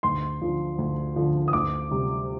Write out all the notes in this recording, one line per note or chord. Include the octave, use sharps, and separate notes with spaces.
D2 C6
D3 F3
D2
D3 F3
D#6
D2 D6
C3 G3